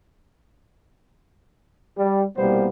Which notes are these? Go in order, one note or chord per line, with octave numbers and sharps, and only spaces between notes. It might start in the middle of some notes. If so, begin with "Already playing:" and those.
G3
C2 B2 G3 A#3 B3 C5